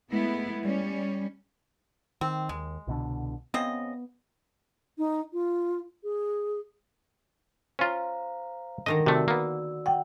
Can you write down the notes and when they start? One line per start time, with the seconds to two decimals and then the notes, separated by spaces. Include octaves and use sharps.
0.11 G#3 A3 B3 E4
0.63 G3 C#4
2.21 D#3 C4
2.49 D#2 G#3
2.87 C2 B2 D3
3.54 C#3 B3 C4 D#5
4.98 D#4
5.33 F4
6.04 G#4
7.79 C#4 F4 C5 F5 A#5
8.86 D3 D#3 D#5 A#5
9.06 C3 A3 F#4 D5 E6
9.28 A#3 B3
9.86 F#5 G5